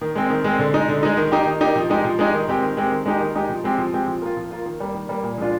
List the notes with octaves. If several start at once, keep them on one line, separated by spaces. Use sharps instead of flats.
D#3
G#3 C4
D#3
G#3 C4
D3
G#3 D#4
D3
G#3 D#4
D#3
A#3 D#4 G4
D#3
A#3 D#4 G4
F3
G#3 D#4 G4
F3
G#3 D#4 G4
D#3
G#3 C4 G4
D#3
G#3 C4 G4
D#3
G#3 D#4 G4
D#3
G#3 D#4 G4
F3
G#3 C4 G4
F3
G#3 C4 G4
F3
A#3 F4
F3
A#3 F4
D#3
G3 A#3
D#3
G3 A#3
A#2
F3 G#3 D4 F4